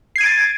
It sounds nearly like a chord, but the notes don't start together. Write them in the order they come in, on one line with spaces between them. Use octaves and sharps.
C7 G#6 D#7 D7 A6